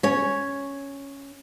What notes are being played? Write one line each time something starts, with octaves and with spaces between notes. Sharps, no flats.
C#4 C#5